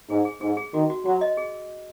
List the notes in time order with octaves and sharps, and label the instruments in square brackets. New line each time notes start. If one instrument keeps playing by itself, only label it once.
[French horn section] G#2 [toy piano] G#4
[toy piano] G#4
[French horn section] G#2 [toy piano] G#4
[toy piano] G#4
[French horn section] D#3 [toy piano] F#4
[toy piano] F#4
[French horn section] F#3 [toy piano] F#4
[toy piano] D#5
G#4